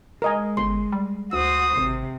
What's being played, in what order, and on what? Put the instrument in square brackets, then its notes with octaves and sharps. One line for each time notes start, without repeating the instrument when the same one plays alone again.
[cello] G#3 [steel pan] A#4 D#5 G#5
[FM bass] G1 [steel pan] C6
[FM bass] G3
[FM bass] D2 [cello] F#4 C5 [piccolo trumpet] D#6
[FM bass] G#1 [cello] C3